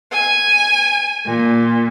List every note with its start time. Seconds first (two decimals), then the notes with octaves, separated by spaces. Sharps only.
0.13 G#5
1.26 A#2